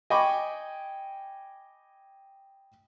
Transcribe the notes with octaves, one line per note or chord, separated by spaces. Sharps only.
D#5 G5 G#5 B5 C#6 D6